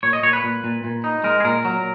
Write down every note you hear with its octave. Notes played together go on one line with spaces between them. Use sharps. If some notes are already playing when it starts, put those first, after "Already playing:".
A#2 C#5
D#5
A#2 C#5
B4
A#2
A#2
A#2
D#4
G#3 A#4
G#4
A#2 A#4
F#3